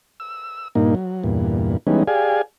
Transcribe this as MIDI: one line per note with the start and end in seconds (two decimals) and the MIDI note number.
0.20 0.68 88
0.75 0.95 43
0.75 0.95 46
0.75 0.95 58
0.75 0.95 63
0.95 1.23 54
1.24 1.77 40
1.24 1.77 43
1.24 1.77 46
1.87 2.03 52
1.87 2.03 55
1.87 2.03 56
1.87 2.03 59
1.87 2.03 61
1.87 2.03 63
2.08 2.42 67
2.08 2.42 68
2.08 2.42 74
2.08 2.42 77
2.08 2.42 80